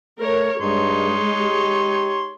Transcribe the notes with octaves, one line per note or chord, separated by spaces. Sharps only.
A3 A#4 C#5
G2 G#3 D#4 C#5 C6
G4